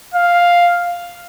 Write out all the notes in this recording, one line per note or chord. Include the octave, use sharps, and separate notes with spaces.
F5